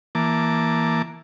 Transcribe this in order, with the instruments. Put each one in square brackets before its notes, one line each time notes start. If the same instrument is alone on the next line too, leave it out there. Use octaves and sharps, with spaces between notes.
[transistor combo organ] E3 A#3 A5 D6